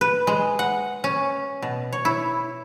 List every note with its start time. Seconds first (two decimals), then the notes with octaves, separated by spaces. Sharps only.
0.01 B4
0.27 G#3
0.59 F#5
1.04 C#4
1.62 B2
1.93 C#5
2.05 E4